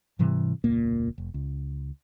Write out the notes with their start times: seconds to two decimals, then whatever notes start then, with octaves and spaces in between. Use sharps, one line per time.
0.19 G#2 C3 E3 G3
0.64 E1 C#2 A#2 A#3
1.18 F1
1.34 C#2